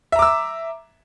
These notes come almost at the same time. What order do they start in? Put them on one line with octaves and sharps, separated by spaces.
E5 A#5 D6 E6